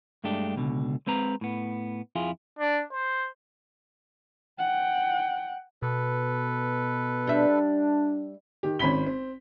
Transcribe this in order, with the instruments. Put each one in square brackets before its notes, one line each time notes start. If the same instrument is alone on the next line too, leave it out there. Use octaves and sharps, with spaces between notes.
[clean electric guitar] G2 G#3 A3 D4 G4
C#2 B2 D3
G#3 C4 B4 A#5
A2 B3
F2 E4 F4 G#4
[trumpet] D4
C5
[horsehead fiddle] F#5 G5
[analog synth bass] B2 [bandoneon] A4 B4
[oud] G3 E5 [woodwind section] D4
[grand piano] D#3 G4
G#1 C4 C#4 B5 B6 G7
C4